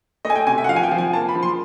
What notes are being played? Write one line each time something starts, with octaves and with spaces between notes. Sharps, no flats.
A3 D#5
G#5
G5
C3 G#5
E5
F#5
F3 F5
G#5
G5
F3
G#5
A#3 A5
B5
F3
C6